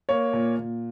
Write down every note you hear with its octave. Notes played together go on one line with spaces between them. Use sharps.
A#3 C#5
A#2
A#2